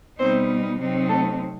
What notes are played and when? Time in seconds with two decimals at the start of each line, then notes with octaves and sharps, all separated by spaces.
0.19 B2 G3 B3 C4 D#4 C5
0.80 C3 F#3 C4 D#4
1.09 A3 A4